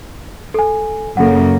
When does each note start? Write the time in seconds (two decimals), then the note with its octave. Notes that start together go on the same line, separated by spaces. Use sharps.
0.54 A4 G#5
1.17 F#2 C#3 A#3 A4 F#5